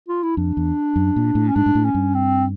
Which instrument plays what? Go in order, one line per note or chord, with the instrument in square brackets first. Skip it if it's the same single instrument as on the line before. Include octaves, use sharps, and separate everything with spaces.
[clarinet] F4
E4
[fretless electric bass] F2 [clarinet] D4
[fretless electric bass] E2
F#2
A#2
A2
[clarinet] C#4
[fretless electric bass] G#2 [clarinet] D4
[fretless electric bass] G#2
A2
[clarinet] C#4
[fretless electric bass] G2
[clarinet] C4